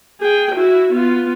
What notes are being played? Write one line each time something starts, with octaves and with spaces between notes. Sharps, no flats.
G#4 G5
E4 F#4
B3 F4